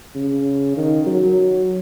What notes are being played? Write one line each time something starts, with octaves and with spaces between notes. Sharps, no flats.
C#3
D#3
F#3